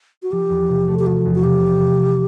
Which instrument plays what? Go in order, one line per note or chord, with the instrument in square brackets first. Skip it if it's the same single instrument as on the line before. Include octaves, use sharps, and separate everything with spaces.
[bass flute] F#4
[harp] F3 [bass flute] G4
[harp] E2
C3
A3
[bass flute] G4
[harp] F3 [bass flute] F#4
[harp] E2
[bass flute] F#4
[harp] C3 [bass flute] G4